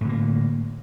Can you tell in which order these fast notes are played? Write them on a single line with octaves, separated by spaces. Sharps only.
A2 D3 A#3